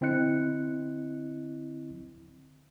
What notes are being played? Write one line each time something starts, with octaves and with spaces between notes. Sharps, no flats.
D3 C4 E4 D#5 F#6 C#7